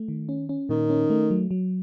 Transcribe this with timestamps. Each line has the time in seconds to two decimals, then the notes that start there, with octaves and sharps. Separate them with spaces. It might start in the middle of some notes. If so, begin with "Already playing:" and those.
Already playing: A3
0.08 D#3
0.29 C#4
0.49 C#4
0.69 A#2 D#3
0.90 C#4
1.10 A3
1.31 F#3
1.51 F#3